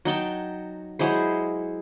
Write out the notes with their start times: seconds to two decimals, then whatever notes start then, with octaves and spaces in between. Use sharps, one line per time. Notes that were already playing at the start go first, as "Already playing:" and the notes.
0.05 F#3 D#4 G5 A5
0.99 F#3 G#3 E4 C5